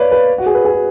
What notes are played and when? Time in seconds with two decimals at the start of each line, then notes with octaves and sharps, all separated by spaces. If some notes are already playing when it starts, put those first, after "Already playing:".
Already playing: B4 C#5 D5 F5
0.12 B4
0.38 F#4
0.46 G#4
0.55 B4
0.65 G#4
0.72 F#4